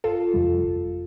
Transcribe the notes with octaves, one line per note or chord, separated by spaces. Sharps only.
G1 F4 A4
F2 C3 G3
G1